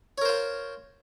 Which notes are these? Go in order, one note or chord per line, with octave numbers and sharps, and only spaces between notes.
F4 A#4 C5 C#5